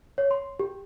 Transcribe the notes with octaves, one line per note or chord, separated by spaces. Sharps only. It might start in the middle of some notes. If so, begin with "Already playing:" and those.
C#5
C6
G4